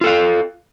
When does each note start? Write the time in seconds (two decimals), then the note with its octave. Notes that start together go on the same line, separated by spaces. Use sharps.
0.01 F4
0.04 A4
0.06 F5